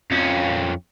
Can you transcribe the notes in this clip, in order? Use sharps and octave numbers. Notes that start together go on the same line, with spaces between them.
F2 C#4